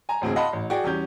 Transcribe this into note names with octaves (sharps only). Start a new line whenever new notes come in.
G#5 A#5
A1 D2 C4 G#4
D#5 F5 F#5 A5 B5 C6
A1
F#4 G#4 D5 G5
E2 G3 C#4 G6